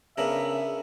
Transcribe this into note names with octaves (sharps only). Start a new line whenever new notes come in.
C#3 B3 D4 A#4 E5